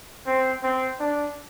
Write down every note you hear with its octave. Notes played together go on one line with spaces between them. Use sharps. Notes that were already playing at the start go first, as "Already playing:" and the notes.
C4
C4
D4